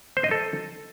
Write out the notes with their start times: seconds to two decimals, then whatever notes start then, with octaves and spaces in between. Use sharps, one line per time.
0.17 C5
0.24 D#5
0.31 A4